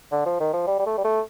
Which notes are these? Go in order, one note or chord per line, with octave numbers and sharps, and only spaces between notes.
D3
F3
D#3
F3
G3
G3
A3
G3
A3